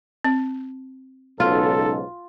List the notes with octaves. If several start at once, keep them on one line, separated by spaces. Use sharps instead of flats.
C4
B1 G#2 C#3 F4 A4